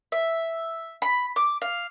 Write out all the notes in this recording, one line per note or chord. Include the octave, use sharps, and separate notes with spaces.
E5
B5
D6
F5